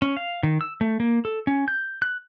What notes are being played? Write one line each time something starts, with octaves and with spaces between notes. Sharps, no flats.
C#4
F5
D#3
E6
A3
A#3
A4
C#4
G6
F#6